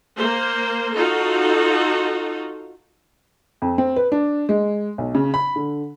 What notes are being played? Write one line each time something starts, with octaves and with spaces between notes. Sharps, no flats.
A#3 C5
D#4 F4 F#4 A4
F2
C4
B4
D4
G#3
B1
C#3
B5
D3